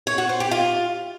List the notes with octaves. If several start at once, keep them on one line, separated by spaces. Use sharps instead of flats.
C#5
F#4
C5
G4
F4